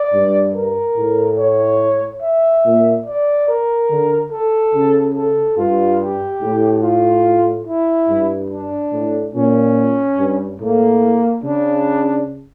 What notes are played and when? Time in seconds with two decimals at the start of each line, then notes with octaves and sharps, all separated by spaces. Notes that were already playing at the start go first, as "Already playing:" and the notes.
Already playing: D5
0.12 G2
0.54 A#4
0.96 A2
1.38 C#5
2.22 E5
2.64 A#2
3.06 D5
3.48 A#4
3.90 D3
4.32 A4
4.74 C#3
5.15 A4
5.57 G2 F4
6.00 G4
6.41 A2
6.82 F4
7.67 E4
8.09 G2
8.50 D4
8.92 A2
9.35 A#2 C#4
10.18 G2
10.60 A2 A#3
11.43 C#3 D4